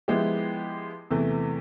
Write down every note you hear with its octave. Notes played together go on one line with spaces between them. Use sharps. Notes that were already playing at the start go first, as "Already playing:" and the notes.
F3 G#3 B3 E4 G4
E2 C3 E3 A3